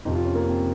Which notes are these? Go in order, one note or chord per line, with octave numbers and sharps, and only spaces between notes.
F2 C3 F3 D#4
F4
C#4
A#3
C4